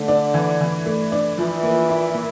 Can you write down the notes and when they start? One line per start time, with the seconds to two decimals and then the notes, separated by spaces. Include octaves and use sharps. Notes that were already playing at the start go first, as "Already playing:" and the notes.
Already playing: D3 A3
0.08 D4
0.34 E3
0.61 E3
0.86 A3
1.12 D4
1.38 E3 F3
1.63 A#3
1.89 E4
2.14 A#2